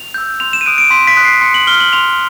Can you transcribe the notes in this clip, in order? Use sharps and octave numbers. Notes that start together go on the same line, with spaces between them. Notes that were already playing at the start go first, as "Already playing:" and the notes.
Already playing: F7
E6 G6
C6 F7
E7
D#7
D#6 F#6 D7
D7
C6 B6
B6
D#6 F#6
C7
C6 C#7
F#7
F6 G7
F#7
C6 F7